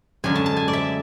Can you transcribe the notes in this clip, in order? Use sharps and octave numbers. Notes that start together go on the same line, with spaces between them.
F#2 D3 G#3 G#5
A5
A5
G#5
D5
E5